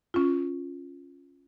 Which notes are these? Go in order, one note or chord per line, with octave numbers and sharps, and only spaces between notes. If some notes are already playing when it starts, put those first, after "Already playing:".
C#4 F4